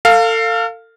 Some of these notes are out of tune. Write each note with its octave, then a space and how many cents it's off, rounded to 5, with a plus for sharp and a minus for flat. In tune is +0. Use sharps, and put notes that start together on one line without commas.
A4 +35 F5 +0